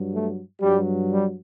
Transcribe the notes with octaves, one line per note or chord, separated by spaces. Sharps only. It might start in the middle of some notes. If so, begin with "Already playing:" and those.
Already playing: G2 F#3
A3
G2 F#3 G3
G3